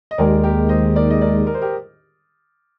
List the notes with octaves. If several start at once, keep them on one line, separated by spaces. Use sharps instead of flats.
D#5
D#2 D#3 G#3 A#4 D5
G4 A#4
C5 D#5
A#4 D5
D#5
A#4 D5
A#4
C5
G4 A#4